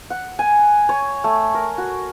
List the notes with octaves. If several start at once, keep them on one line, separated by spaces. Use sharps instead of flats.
F#5
G#5
C#5
A3
A#4
F#4